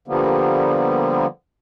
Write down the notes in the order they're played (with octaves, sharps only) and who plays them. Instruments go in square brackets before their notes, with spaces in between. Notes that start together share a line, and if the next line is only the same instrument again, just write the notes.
[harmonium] D3 F3 G3 A#3 B3